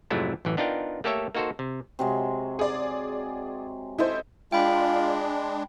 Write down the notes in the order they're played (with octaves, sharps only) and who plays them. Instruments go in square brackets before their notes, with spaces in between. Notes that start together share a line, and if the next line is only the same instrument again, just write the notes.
[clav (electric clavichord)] F2 G#2 C3 F#3 A3 E4
A1 F#2 E3
B3 D4 D#4 F4 A#4 G5
A3 A#3 G4 A4 C#5 E5
A#3 D#4 F#4 A4 C5
C3
[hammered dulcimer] C3 F#3 G#3
[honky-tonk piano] G#4 D5
[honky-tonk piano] E4 C5 [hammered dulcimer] A4 D#5
[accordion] G#3 D4 [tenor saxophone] F4 [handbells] G5 B5